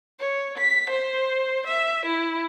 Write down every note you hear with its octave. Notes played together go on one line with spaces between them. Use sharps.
C#5
B6
C5
E5
E4